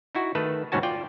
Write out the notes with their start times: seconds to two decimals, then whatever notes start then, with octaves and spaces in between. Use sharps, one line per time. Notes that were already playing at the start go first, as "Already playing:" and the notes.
0.15 D#4 E4 F#4
0.35 D#3 A3 B4 A5
0.72 D#2 G#2 C#3 C#4 F#4 A5
0.83 F4 D5 G5